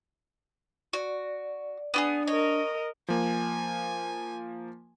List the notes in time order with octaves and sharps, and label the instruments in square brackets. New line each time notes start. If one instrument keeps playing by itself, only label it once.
[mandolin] F#4 [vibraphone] D5
[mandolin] B3 G4 G#4 [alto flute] D4
[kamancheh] A#4 D#5 [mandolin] C#5
[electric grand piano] F3 A#3 [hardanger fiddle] G#5